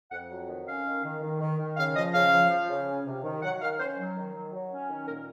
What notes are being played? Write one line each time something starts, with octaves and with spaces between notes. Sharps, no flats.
F2 F#5
F#3
D#3
C#4 F5
D#3
D#3
D#3
D#3
D#3
C#3 F5
F3 D#5
C#3 F5
F3
F3
C#3
C#4
C3
D#3
F#3 F#5
D#3 F5
C#4 C5
F#3
D#3
F#3
F#3
C#4
D#3
A#2 A#4